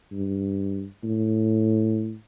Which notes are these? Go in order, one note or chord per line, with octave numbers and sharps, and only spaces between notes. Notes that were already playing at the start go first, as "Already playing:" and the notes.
G2
A2